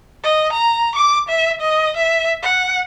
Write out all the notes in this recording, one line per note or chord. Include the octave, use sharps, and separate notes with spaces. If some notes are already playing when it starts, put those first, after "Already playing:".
D#5
A#5
D6
E5
D#5
E5
F#5